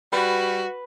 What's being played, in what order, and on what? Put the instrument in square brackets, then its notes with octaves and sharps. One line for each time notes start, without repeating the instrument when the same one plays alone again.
[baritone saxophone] G3 [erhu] F#4 [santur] B4